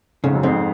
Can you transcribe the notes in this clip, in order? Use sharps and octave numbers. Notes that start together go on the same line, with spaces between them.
F2 G#2 C#3
F#2
F2 G#2 C4